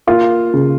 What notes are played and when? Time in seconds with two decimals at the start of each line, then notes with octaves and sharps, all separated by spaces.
0.07 A#3 F4
0.54 C#3